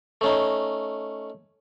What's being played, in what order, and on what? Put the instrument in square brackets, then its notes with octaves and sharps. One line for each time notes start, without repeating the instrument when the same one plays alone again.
[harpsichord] A3 C#4 D#4